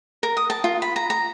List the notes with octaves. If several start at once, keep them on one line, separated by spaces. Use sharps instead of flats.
A#4
D#6
A5
F4
B5
A#5
A#5